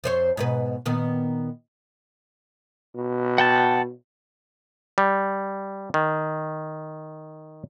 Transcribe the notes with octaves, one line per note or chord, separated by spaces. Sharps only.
F2 C5 C#5
G#2 B2 B4
A#2 D#3 B3
B2
F#5 G5 A5
G3
D#3